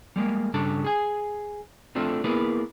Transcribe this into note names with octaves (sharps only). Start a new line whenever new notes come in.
G3 G#3 A#3
G2 C#3 G3 D4 A4 A5
G#4 G#5
A3 C4 D4 F4 A4
A#3 B3 E4 G#4 A#4 B4